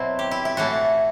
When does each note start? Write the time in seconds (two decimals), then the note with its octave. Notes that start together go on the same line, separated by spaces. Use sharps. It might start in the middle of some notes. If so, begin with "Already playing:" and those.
Already playing: B2 F#3 C4 E4
0.19 G4
0.31 E4
0.45 E4
0.57 A2 E3 A3 F#4